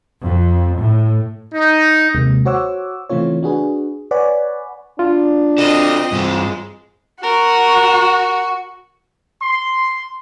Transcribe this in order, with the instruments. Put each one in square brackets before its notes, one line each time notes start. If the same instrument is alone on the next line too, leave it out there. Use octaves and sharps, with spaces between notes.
[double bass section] F2
A2
[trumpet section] D#4
[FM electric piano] D#2 C3 G#3 A#3
F#4 C5 C#5 F#5 D6 E6
C#3 E3 A3 C4 F4 C#5
D4 F#4 G#4 B4
B4 C#5 D5 F#5 G#5 B5
[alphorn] D4 [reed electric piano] F4
[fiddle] C4 D#5 [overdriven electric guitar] F#4 A4
[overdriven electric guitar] G2 C4 [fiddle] G#3
[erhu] F#4 [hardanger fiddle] A#4
[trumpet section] C6